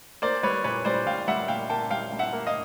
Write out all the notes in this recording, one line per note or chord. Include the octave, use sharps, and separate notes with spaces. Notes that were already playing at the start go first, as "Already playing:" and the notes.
A#3 C5 D5
G3 B4 C#5
A#2 B4 C#5
G3 C5 D5
A#2 F5 G5
G3 E5 F#5
A#2 F5 G5
A#3 G5 A5
G3 F5 G5
G3
E5 F#5
A#3
D#5 F5